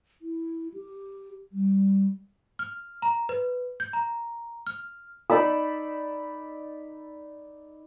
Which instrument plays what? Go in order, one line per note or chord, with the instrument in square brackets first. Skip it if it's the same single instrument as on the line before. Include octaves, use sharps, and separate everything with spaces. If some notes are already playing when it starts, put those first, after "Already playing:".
[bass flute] E4
G4
G3
[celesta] F6
A#5
B4
G6
A#5
F6
[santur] D#4 D5 B5 E6